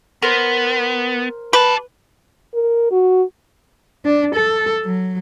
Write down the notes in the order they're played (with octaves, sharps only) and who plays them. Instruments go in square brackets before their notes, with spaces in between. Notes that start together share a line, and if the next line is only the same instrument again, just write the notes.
[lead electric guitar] B3 [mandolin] A#4 C5
[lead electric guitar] G4 A5 [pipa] B4
[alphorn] A#4
F#4
[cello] D4
A4
F#3